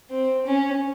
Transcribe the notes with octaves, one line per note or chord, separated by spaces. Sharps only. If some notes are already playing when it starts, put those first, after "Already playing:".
C4
C#4